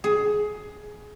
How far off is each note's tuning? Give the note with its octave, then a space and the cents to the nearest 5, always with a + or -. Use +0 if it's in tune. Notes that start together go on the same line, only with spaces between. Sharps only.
G#4 +15